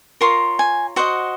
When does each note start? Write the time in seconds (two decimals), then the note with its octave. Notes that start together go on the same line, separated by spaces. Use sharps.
0.21 F4 A#4 C#5 C6
0.59 G#5
0.96 F#4 C5 D#5 F#5